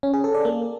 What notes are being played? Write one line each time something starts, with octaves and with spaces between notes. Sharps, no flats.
C#4
G#4
A4
D5
A#3